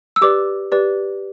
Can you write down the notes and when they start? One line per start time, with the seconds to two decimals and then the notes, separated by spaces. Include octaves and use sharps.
0.16 E6
0.21 G4 B4 D5 D6
0.72 G4 B4 D5